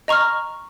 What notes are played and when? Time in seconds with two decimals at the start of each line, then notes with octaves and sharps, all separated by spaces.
0.08 D#5 A#5 C#6 F6